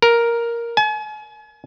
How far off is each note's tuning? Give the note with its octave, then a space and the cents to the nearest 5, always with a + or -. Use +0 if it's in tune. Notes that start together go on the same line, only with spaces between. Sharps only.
A#4 +5
G#5 +40